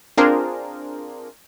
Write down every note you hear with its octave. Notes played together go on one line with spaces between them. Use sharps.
C4 D4 F4 G#4 A#4 C5